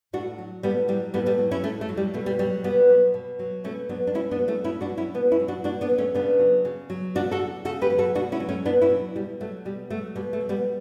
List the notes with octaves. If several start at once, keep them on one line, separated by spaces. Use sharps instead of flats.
A2 D4 F#4
F#3
A2 G3 B3
F#3 G3
A2 G3 B3
G3 B3
F#3
C#4 E4
A2 A3 C#4
A3
F#3
G3
B2 A3
G3
F#3 G3
B2 G3 B3
F#3
B2
F#3
B2 A3 C#4
F#3 B3 D4
D4
B2 C#4 E4
B3 D4
F#3
A3 C#4
B2 C#4 E4
D4 F#4
F#3
C#4 E4
B2 B3 D4
C#4 E4
F#3
D4 F#4
B2 D4 F#4
B3 D4
F#3
A3 C#4
C#3 B3 D4
F#3
C#3
F#3
C#3 D4 F#4
F#4 A4
F#3
C#3 F#4 A4
G4 B4
F#3
F#4 A4
B2 D4 F#4
C#4 E4
F#3
A3 C#4
B2 B3 D4
C#4 E4
F#3
B2 G3
F#3 A3
B2 G3
F#3 A3
B2 G3
A3
F#3
G3 B3